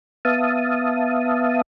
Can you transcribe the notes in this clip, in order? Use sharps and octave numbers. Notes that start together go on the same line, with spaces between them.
B3 E5 F5 A5 D#6